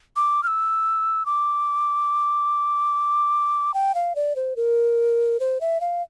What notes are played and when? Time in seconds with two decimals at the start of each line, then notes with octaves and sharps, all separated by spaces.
0.16 D6
0.43 F6
0.47 E6
1.26 D6
3.74 G5
3.95 F5
4.16 D5
4.36 C5
4.56 A#4
5.40 C5
5.61 E5
5.81 F5